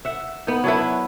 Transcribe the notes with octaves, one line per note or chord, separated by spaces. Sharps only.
E5 F#5
B3 D#4
F#3 D4 E4 B4